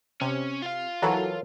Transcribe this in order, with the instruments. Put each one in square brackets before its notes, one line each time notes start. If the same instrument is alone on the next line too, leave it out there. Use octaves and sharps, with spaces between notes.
[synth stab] C3 [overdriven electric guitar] C#4
[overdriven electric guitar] F4 F5
[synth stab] E3 F#3 A4 [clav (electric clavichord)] A#4 C#5 F#5